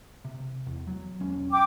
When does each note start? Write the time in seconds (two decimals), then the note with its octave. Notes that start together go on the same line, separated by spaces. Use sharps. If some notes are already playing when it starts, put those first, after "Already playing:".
0.25 C3
0.67 E2
0.87 F#3
1.20 E1 B1 C#4
1.51 G5 D6